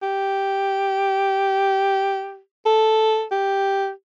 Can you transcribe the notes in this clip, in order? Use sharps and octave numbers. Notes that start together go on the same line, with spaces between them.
G4
A4
G4